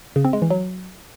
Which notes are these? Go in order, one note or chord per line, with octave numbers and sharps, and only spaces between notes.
C#3
C4
G#3
E3
F#3